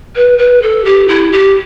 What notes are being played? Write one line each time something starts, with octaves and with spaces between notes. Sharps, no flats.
B4
B4
A4
G4
E4
G4